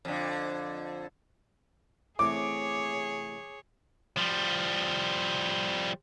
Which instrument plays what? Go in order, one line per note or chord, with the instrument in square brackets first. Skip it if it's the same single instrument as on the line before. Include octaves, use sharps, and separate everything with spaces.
[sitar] F2 D3
[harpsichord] A1 C3 G#5 [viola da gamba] G#4 C#5 [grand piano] D6
[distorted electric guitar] F3 G3